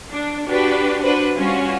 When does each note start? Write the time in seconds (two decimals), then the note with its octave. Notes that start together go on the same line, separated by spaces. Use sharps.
0.10 D4
0.46 D4 F#4 G4 B4
1.01 D4 F#4 B4 C5
1.35 G3 C#4 F4 F#4